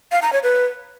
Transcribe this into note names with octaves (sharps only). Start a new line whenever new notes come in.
F5
A#5
C#5
B4